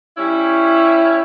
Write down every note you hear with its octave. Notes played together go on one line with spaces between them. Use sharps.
G3 C#4 E4